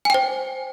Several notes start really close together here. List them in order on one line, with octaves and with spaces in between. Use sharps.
G#5 G5 C5